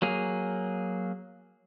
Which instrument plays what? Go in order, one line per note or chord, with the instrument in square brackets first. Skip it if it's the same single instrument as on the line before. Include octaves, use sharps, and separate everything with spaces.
[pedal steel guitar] F#3 A#3 G#4